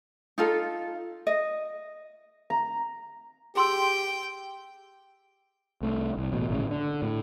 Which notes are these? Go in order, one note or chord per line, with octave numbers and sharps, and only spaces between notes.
D#4 F4 A4
D#5
A#5
G4 G#4 G5 C6 E6
C2 A3
C2
A1 B2
G#1 A2 C#3
D3
A2